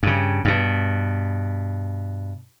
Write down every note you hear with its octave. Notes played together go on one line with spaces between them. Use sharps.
G2 C#3
G2 B2